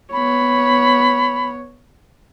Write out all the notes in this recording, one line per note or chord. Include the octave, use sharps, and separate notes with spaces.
B3 C#5 B5